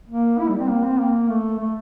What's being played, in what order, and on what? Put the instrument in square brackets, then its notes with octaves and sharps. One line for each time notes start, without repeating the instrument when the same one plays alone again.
[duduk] A#3
E4
G3
C4
A#3
C4
A#3
A3
A3